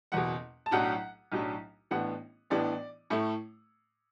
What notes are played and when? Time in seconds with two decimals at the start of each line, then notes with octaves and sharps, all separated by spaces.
0.12 F#1 E2 B2 F#5
0.66 A5
0.71 B1 A2 F#3 D4 F#5
1.32 B1 A2 F#3 D4
1.91 A1 A2 E3 B3 D4 F#5
2.50 A1 A2 E3 B3 D4 D5
3.10 A2 A3 E4